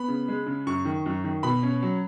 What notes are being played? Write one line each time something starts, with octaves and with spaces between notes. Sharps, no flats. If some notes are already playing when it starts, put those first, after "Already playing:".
Already playing: B3 B5
C#3
G#3
C#3
F#2 C#6
D#3
F#2
D#3
B2 B5
C#4
F#3